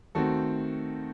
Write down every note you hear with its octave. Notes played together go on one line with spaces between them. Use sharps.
D#3 A3 C4 F#4 A4